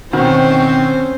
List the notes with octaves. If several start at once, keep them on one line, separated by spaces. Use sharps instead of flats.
B2 D#3 C4 C#4 F#4 C5